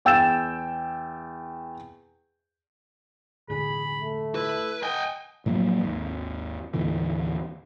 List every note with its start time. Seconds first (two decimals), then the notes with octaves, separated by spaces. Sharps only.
0.05 E2 G5 E6 A6 E7
3.50 E1 A2 D3 G#4 B5
4.01 A3
4.35 E4 B4
4.83 D#5 G5 G#5
5.46 A2 F3 F#3 A#3
5.81 G#1 D#2
6.74 D#2 A2 D3 E3